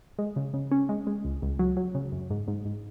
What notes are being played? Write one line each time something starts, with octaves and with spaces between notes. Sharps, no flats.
G#3
C#3
C#3
C#4
G#3
G#3
C#2
C#2
F#3
F#3
C#3
F#2
G#2
G#2
G#2